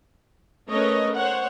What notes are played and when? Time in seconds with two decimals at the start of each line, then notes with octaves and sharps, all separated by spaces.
0.70 A3 C#4 A#4 B4 C#5 D#5
1.17 C5 C#5 F#5